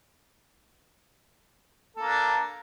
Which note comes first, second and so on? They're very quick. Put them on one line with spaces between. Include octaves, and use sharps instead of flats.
A4 A#3 D4